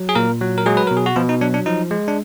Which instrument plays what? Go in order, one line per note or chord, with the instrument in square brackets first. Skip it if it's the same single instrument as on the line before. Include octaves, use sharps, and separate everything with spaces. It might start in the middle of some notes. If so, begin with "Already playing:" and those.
Already playing: [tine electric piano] F#3
G#4
A#2 A#3 A#4
F#3
A#4
F#3 G#3 G#4
B4
B2 A#4
G#4
F#4
B2 F3 F4
D#4
F#3 D4
D4
F3 D#4
G#3
D4